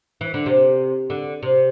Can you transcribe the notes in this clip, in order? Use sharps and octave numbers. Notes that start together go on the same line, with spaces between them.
E3
D3
C3
D3
C3